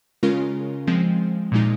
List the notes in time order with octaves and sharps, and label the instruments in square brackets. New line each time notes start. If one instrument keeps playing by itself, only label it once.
[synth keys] C#3 G#3 C#4 F4 A#4
F3 G#3 C4
A#2 F3 G#3 D#4